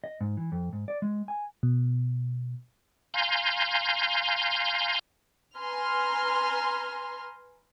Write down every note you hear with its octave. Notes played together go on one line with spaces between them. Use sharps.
D#5
G#2
E3
F2
G#2
D5
G#3
G#5
B2
F5 G#5 A#5 C6 G6
B4 G#5 A#5 C6 F6